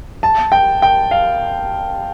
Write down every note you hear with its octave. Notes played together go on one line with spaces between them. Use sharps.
A5
G5
G5
F5